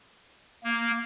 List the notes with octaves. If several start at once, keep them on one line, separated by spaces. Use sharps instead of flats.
A#3